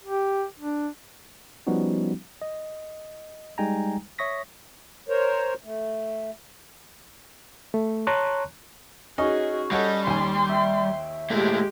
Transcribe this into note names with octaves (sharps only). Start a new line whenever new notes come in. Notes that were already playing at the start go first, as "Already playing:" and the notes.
G4
D4
F3 G3 B3 C#4 D#4 F#4
D#5
G3 G#3 D#4 G5 G#5 A#5
C#5 E5 C#6 D#6 A#6 B6
A#4 C5 C#5
A3
A3
C#5 A5 A#5 C6 C#6 F#6
C#4 D#4 F#4 G#4 D#5
G3 A4 C#5 D#5 F#5
D#2 G#5 C6 D6
E5 G5
A#2 G#3 A3 G4